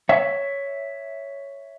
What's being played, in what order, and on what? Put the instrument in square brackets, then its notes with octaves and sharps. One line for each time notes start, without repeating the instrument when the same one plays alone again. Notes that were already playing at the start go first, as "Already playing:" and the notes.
[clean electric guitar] C#5 E5